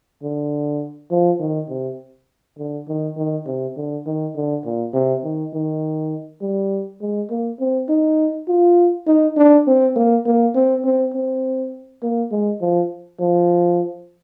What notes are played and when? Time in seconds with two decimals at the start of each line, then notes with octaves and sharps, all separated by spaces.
0.23 D3
1.11 F3
1.40 D#3
1.69 C3
2.59 D3
2.88 D#3
3.17 D#3
3.47 C3
3.77 D3
4.06 D#3
4.36 D3
4.65 A#2
4.94 C3
5.24 D#3
5.54 D#3
6.41 G3
7.01 G#3
7.30 A#3
7.60 C4
7.89 D#4
8.48 F4
9.07 D#4
9.37 D4
9.67 C4
9.96 A#3
10.26 A#3
10.55 C4
10.85 C4
11.14 C4
12.03 A#3
12.32 G#3
12.61 F3
13.20 F3